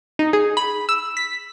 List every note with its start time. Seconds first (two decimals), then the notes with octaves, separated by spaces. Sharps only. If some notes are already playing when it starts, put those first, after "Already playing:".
0.19 D#4
0.33 G#4
0.57 B5
0.89 E6
1.17 B6